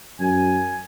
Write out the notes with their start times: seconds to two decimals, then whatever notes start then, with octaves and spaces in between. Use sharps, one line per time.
0.20 F#2 G#5